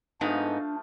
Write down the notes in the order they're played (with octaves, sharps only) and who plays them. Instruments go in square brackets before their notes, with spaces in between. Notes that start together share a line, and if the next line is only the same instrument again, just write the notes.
[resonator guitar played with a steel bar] G#2 B3 D#4 [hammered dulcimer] F3 A3 F5 [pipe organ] D4